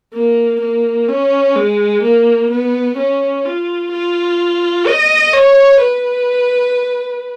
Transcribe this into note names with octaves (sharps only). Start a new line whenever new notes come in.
A#3
A#3
C#4
G#3
A#3
B3
C#4
F4
F4
D#5
C#5
B4